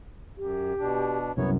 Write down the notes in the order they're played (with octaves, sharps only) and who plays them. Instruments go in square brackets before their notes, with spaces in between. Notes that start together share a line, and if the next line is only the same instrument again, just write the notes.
[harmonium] F#2 [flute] G4
[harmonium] B2 D4
[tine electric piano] C2 F#2 [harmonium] B3 C#5